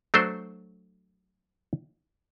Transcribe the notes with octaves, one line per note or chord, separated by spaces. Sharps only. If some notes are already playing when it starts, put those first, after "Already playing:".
F#3 A3 D4 F#4 C5